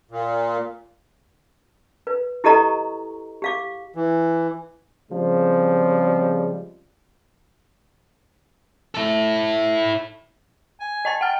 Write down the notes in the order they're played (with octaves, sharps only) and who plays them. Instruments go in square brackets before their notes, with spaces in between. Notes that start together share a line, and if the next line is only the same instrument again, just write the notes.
[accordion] A#2
[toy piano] B4
E4 G4 A4 D#5 A#5 C#6
G4 F5 D6
[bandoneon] E3
[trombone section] C#3 F3 G3 G#3 C4
[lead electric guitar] E4 A4
[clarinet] G#5
[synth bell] D#5 A5 A6
[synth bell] F#5 F6 [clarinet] G5